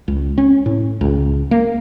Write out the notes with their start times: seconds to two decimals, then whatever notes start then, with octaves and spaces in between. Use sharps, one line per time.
0.08 C#2
0.38 C#4
0.66 A2
1.01 C#2
1.51 A#3